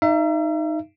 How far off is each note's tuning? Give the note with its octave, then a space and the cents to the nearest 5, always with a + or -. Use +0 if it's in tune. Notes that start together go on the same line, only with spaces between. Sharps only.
D#4 +0 E5 +40